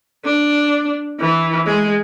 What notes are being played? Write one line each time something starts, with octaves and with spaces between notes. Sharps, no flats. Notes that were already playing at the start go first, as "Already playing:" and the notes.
D4
E3
G#3